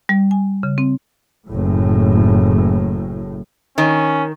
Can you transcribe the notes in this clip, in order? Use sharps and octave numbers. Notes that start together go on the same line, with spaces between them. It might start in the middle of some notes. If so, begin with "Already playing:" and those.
G3
G#5
C#3
C4
F#1 A2
D#3 C#4